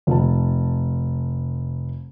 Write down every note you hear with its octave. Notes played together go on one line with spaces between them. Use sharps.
F1 A5